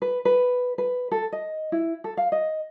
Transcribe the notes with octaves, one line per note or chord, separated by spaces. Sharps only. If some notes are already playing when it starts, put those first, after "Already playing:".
B4
B4
B4
A4
D#5
E4
A4
F5
D#5